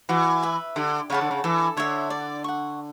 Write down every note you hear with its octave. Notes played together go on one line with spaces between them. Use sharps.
E3 F#4
B4 E5
D3 G4
C#3 C#5 F#5 A5
D3
C#3
E3 A4
D3 C#5 E5
D5
F#5 C#6